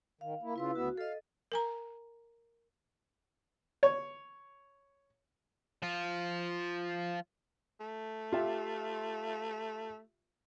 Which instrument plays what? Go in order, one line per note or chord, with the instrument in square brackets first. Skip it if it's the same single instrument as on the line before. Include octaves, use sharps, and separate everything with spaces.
[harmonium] D#3 [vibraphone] F5
[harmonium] A#3 E4
[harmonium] C#3 F4 [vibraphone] E4 B4 E6
[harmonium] D2 B3 E5 [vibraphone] F#4
[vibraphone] A4 D#5 [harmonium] F5
[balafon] A#4 G#5 A#5
[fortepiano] C#5
[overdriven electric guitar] F3 F4
[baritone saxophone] A3
[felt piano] F4 G4 E5